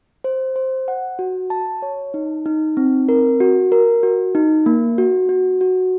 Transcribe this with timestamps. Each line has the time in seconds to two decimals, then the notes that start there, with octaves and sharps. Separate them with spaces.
0.24 C5
0.56 C5
0.88 F#5
1.19 F#4
1.50 A5
1.82 C#5
2.14 D#4
2.46 D#4
2.77 C4
3.09 A#4
3.40 F#4
3.72 A#4
4.03 F#4
4.35 D#4
4.66 A#3
4.98 F#4
5.29 F#4
5.61 F#4